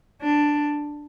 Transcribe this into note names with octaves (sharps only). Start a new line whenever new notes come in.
D4